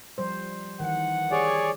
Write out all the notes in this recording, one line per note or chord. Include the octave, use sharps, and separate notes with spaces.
F3 G3 C5
D#3 E3 F#5
G4 G#4 C#5 D5